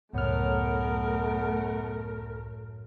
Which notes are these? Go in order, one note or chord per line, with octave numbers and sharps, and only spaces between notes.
C#2 F#2 A2 A3 B3 A#4 F6